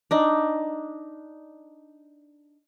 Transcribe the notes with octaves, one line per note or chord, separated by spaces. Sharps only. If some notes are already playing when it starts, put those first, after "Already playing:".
D4 D#4